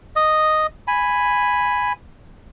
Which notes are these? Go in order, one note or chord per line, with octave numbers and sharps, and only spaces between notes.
D#5
G#5 B5